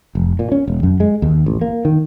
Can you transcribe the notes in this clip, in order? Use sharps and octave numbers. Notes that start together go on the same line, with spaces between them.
F1
A#2
C#4
E1
F#2
G#3
D#2
A1
A#3
D#3